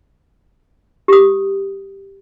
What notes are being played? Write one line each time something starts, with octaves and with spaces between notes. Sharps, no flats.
G4 D#6